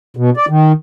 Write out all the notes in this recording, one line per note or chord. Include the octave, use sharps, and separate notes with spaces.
B2
D5
D#3